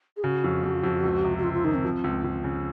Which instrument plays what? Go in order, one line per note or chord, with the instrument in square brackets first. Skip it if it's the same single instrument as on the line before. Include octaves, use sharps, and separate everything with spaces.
[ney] G#4
[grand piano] C#3 [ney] F#4
[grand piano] F2
F2
F2
C#2
C3
[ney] F#4
[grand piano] C#2 [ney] F4
[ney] F4
[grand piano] D#3 [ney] D#4
[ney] C4
[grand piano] F3
C#2
C#2
C#3